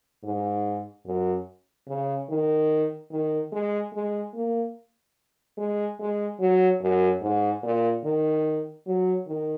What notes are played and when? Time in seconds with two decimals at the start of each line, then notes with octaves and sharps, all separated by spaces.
0.23 G#2
1.06 F#2
1.88 C#3
2.29 D#3
3.11 D#3
3.52 G#3
3.93 G#3
4.34 A#3
5.57 G#3
5.99 G#3
6.40 F#3
6.81 F#2
7.21 G#2
7.63 A#2
8.04 D#3
8.86 F#3
9.27 D#3